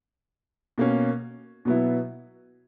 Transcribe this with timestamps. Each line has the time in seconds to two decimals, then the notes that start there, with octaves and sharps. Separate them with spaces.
0.78 B2 A#3 C#4
1.65 B2 F#3 B3 E4